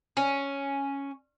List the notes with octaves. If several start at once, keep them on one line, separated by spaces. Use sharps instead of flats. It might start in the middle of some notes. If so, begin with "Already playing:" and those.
C#4